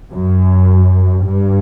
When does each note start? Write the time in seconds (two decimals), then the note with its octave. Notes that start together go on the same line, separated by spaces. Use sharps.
0.12 F#2
1.25 G2